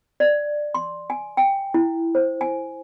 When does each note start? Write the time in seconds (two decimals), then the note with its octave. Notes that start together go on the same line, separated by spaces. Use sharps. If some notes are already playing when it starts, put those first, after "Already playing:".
0.20 D5
0.74 C6
1.10 G#5
1.37 G5
1.74 E4
2.15 C5
2.41 G#5